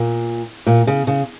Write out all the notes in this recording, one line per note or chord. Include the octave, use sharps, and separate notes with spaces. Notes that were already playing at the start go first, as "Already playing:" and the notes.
Already playing: A#2
A#2
C#3
C#3